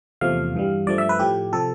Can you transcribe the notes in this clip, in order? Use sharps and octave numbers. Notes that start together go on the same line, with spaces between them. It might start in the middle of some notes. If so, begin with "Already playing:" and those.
E2 C3 F3 A3 F5
G2 E3 G3
G2 F3 A3 D5
E5
B4
A2 F3 A3 G4
C3 F3 A4